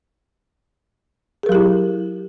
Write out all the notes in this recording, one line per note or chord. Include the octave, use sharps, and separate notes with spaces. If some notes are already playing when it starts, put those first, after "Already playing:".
F#3 E4 G4 G#4 A#4